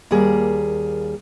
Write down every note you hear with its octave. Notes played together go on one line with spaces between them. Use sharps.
D#2 G3 A#3 G#4